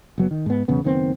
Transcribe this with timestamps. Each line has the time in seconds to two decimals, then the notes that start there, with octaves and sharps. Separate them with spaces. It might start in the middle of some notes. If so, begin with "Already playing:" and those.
0.18 F#1 F#3 B3
0.31 D#3
0.46 G#2 B3
0.68 B1 E2 C#3 B3
0.84 F#1 D#3 B3 C4